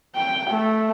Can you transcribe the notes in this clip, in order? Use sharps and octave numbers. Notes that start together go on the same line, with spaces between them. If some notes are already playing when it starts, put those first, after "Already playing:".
G5
A3